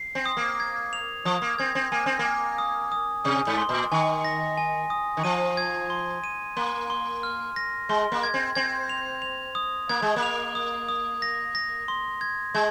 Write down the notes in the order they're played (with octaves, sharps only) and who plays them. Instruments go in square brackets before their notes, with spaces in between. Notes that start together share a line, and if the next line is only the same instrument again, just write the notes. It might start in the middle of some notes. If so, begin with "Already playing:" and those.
Already playing: [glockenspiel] C7
[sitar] C4
[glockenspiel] D#6
[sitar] A#3
[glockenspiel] G#6
F7
[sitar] F3 [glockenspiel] D#6
[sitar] A#3
[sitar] C4 [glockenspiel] G#6
[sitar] C4
[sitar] A#3 [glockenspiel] G#5
[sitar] C4
A#3
[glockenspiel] G#5
D#6
D#6
[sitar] C3 [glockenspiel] D#6
[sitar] G#2
[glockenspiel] C6
[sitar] A#2
[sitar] D#3 [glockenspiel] G#5
[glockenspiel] A#6
G#5
D#6
[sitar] D#3
[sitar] F3 [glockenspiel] D#7
[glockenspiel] G#6
C6
D#7
[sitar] A#3 [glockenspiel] C6
[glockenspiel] C6
F6
A#6
[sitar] G#3 [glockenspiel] C6
[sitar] A#3
[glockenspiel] G#6
[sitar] C4
[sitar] C4 [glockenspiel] G#6
[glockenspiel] F7
F7
D#6
[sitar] A#3 [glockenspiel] G#6
[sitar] G#3
A#3
[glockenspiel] F7
D#6
D#6
A#6
A#6
C6
G#6
[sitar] G#3 [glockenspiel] G#6